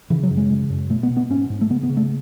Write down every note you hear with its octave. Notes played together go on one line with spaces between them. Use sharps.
C#3 E3
F#3
F#2
G#3
C#3
F#2
B2 A3
B3
B2
B3
G#2 C#4
G#2
A3
C#3 B3
B3
C#3
A3